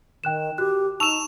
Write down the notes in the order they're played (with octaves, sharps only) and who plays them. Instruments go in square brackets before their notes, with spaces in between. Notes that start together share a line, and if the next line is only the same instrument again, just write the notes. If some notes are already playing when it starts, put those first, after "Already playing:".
[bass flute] D#3 [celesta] G5 F#6 E7
[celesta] F#4 F#6 [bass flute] G4
[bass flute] D#4 [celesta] A5 C#6 E6 [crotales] E7 F7